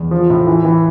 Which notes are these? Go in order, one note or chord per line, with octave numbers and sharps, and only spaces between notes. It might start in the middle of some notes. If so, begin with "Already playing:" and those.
Already playing: E2
F3
A2
E3
E3